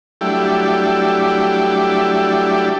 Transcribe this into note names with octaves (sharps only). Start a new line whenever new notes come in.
F#3 G3 A3 D4 E4 G4